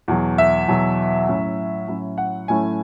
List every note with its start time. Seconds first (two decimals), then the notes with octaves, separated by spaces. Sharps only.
0.08 E2 B2 F#3
0.38 E5
0.68 E2 B2 F#3
1.28 A2 F#3 C#4 E4
1.88 A2 F#3 C#4 E4
2.18 F#5
2.48 A2 F#3 A3 C#4 E4 G#5